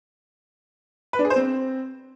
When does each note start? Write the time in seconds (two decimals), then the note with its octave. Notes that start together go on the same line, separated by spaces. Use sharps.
1.13 B4
1.19 D4
1.25 G#4
1.30 C5
1.36 C4